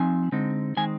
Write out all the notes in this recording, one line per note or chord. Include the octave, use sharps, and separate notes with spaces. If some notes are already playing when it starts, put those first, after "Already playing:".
Already playing: F3 C4 D#4 G#5
D3 G#3 C4 D#4
D#3 G#3 C4 D#4 G#5